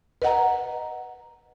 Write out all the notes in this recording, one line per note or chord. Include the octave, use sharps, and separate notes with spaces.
B4 D#5 F#5 A#5